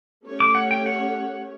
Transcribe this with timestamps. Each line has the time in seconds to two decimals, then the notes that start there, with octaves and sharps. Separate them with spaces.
0.24 A3 C#4 G4 C#5
0.40 D6
0.55 F#5
0.71 G5
0.86 F#5